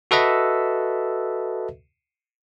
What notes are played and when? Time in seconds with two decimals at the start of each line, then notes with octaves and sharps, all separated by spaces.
0.11 F#4 A4 B4 D#5 E5